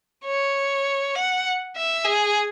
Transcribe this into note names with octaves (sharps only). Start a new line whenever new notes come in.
C#5
F#5
E5
G#4